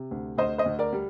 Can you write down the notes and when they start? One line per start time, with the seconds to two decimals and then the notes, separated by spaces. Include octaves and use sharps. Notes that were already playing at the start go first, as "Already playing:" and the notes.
Already playing: C3
0.11 D2
0.37 D2 C5 D#5
0.58 C5 D#5
0.66 D2
0.79 A#4 D5
0.93 G3